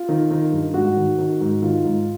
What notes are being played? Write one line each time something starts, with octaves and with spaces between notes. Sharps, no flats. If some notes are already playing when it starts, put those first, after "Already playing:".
Already playing: F4
D#3
D#3
G2
G#2 F#4
D#3
D#3
G#2
D#3 F4
G#2